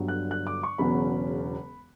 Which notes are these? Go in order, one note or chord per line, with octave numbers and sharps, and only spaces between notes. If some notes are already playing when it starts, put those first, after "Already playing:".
Already playing: G1 G2 D3 F#3
F#6
F#6
D6
C#6
E1 E2 C#3 F#3 C#4 B5